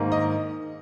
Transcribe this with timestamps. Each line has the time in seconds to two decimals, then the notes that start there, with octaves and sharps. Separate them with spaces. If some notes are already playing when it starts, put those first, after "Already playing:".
Already playing: G#2 D#3 A#3
0.12 D#5